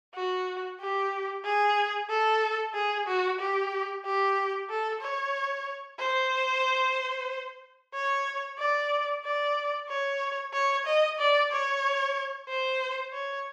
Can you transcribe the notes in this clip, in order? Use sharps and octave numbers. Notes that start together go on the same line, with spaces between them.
F#4
G4
G#4
A4
G#4
F#4
G4
G4
A4
C#5
C5
C#5
D5
D5
C#5
C#5
D#5
D5
C#5
C5
C#5